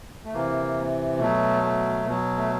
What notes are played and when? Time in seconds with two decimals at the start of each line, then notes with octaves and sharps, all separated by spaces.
0.24 A3
0.33 C3 E3 A#3
1.19 B2 F#3 A3
1.62 A3
2.05 B2 F#3
2.37 A3